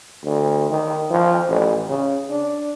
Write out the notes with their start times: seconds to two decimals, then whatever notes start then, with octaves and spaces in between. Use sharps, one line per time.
0.24 D2
0.71 D#3
1.11 F3
1.49 A1
1.89 C#3
2.30 D4